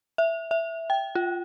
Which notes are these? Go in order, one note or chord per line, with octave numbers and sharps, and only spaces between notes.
E5
E5
G5
F4